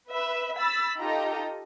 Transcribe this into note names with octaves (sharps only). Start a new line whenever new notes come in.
B4 E5 E6
B5 E6 A6 B6
D#4 F4 G4 A4 D#5 A#5